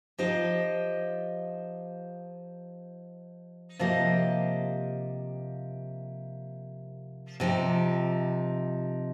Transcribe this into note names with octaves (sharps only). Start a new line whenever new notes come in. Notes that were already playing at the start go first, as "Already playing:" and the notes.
F3 D#4 G4 C5 D#5
C3 F3 A#3 G4 D#5
C3 F3 D#4 G4